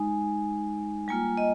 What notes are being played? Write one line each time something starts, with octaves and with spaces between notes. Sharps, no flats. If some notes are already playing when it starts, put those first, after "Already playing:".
Already playing: G#3 D#4 G#5
G3 A#3 F4 G#5
D#5